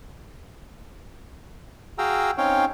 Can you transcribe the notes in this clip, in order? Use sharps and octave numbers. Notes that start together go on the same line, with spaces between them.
F#4 G#4 F5 G5 A#5 E6
C4 C#4 D#4 C#5 F5 G5